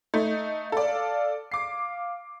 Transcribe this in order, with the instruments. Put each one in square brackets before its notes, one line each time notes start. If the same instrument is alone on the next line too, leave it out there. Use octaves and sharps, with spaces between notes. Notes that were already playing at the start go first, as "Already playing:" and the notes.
[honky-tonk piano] A3 D#4
[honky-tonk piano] A4 D5 [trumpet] F5
[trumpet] F5 [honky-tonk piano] D6 C7